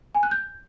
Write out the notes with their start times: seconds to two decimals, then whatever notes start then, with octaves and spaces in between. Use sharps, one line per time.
0.15 G#5
0.23 F#6
0.31 G6